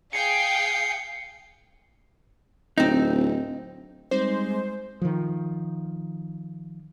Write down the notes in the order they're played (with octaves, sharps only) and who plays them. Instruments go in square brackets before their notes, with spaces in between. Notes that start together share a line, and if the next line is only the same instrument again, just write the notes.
[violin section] G#4 F5 G5 [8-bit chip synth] C7 C#7
[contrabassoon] D1 [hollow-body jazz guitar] C4 D#4
[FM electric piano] G3 C4 D#4 [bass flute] G#3 [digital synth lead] C5
[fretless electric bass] D#3 F3